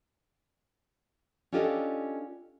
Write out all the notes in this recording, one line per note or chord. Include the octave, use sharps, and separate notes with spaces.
C#4 D4 F4 G4 A4 D#5